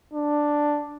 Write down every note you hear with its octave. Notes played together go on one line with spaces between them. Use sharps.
D4